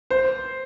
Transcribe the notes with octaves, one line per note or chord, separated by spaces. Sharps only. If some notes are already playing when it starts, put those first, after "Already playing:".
C5